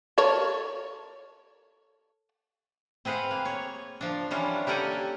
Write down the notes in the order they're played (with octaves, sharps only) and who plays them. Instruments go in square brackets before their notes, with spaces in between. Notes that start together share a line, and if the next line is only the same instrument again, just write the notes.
[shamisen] A4 A#4 C#5
[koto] C4 G#4 B4 F5 F#5
A#3
C#5
F3 D4
E3 G3 C#4 D4 F4
A#3 G4 A4 A#4 F#5 G#5